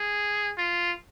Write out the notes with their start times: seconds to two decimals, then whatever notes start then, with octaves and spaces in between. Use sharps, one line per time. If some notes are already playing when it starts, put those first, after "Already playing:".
Already playing: G#4
0.58 F4